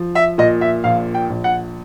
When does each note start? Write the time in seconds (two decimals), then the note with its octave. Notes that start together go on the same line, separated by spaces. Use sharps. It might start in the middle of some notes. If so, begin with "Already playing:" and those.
Already playing: F3
0.15 E5
0.38 A#2 D#5
0.61 E5
0.84 A#1 F5
1.14 G5
1.30 A#1
1.44 F#5